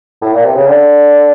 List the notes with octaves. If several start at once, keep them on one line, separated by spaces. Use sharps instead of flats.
A2
A#2
C3
C#3
D3